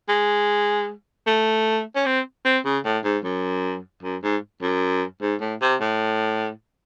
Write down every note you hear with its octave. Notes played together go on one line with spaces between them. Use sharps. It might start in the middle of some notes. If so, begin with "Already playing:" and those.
G#3
A3
C#4
C4
C4
C#3
A2
G#2
F#2
F#2
G#2
F#2
G#2
A2
C3
A2